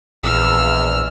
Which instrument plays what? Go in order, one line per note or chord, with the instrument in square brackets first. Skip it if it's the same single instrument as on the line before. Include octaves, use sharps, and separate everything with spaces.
[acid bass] A#1 [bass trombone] E2 [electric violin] E6 F6